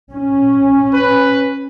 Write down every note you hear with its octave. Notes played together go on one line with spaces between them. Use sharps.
C#4
B4